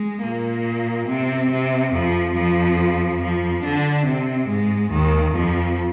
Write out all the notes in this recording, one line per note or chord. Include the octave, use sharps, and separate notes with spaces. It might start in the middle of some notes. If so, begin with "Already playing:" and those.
Already playing: G#3
A#2 A#3
C3 C4
C3 C4
F2 F3
F2 F3
F2 F3
D3 D4
C3 C4
G#2 G#3
D#2 D#3
F2 F3